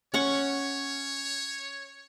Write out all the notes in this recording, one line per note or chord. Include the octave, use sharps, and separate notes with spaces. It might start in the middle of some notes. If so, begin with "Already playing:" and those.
C#4 C#5 F#5 C#6